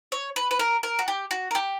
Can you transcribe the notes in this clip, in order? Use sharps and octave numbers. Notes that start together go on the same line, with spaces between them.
C#5
B4
B4
A#4
A#4
F#4
G4
F#4
A#4
G4